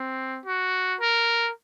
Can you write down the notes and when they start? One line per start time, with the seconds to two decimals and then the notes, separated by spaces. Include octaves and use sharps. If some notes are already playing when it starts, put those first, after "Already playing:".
Already playing: C4
0.46 F#4
1.01 A#4